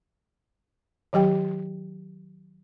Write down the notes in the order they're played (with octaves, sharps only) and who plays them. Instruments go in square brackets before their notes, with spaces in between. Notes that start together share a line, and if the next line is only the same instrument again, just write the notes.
[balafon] D#3 F#3 G4 G5